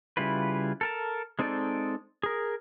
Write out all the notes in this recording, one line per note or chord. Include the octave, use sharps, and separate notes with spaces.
C#3 G3 E4 F4 B4
A4 A#4 A5
G#3 C4 D#4 A4 D5
G#4 A#4